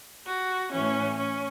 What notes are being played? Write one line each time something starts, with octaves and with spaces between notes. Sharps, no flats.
F#4
A2 E3 C#4
C#4